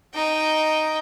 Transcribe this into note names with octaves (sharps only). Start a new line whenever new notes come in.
D#4 G5